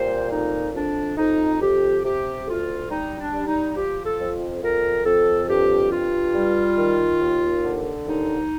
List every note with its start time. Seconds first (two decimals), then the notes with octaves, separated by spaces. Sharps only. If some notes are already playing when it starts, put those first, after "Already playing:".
Already playing: A#2 G3 C5
0.32 F2 D#4
0.75 F2 D4
1.18 F2 D#4
1.61 F2 G4
2.04 C3 G4
2.47 D2 F4
2.90 G3 D#4
3.19 D4
3.34 G3
3.47 D#4
3.76 F3 G4
4.05 A4
4.20 F2
4.63 F2 A#4
5.06 F2 A4
5.49 G2 G4
5.91 G2 F4
6.35 G3
6.77 D#3
7.21 D#2
7.64 D3
8.07 D#2 D#4